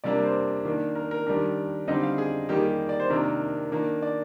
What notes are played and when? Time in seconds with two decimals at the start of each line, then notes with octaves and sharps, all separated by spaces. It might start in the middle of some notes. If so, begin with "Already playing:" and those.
0.04 C3 G3 A#3 D4 D5
0.24 C5
0.65 D#3 A#3 D4
0.95 A#4
1.11 A#4
1.27 D#3 G3 D4 A#4
1.88 D3 G3 C4 D#4 D#5
2.03 F5
2.18 G#4
2.49 D#3 G3 A#3 D#4 G4
2.57 G#4
2.65 G4
2.89 D5
3.00 C5
3.10 C3 D#3 A#3 D4 A#4
3.72 D#3 A#3 D4
4.02 D5